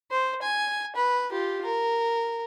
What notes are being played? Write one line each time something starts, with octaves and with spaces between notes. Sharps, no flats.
C5
G#5
B4
F4 G4
A#4